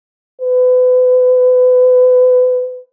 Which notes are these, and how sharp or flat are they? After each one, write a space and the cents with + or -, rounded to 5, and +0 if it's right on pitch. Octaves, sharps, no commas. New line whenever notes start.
B4 +35